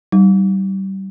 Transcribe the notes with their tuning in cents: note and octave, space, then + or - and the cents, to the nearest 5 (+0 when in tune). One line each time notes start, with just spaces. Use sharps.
G3 -25 D#4 +0